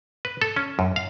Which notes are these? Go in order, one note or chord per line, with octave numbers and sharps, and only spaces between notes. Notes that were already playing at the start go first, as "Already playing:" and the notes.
B4
A4
C#4
F#2
F5